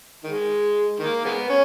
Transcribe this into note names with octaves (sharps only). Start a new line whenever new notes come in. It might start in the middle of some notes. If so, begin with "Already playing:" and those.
D#3 G#3
D#3 A#3
G#3 B3
C#4